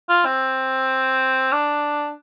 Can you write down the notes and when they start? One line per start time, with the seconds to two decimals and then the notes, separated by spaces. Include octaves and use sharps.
0.09 F4
0.25 C4
1.52 D4